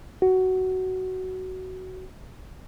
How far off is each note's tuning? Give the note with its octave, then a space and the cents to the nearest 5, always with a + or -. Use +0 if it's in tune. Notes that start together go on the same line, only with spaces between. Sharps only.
F#4 +10